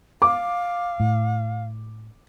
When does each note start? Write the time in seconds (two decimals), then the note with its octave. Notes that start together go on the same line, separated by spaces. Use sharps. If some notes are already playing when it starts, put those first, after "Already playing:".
0.22 F5 D6
1.00 A2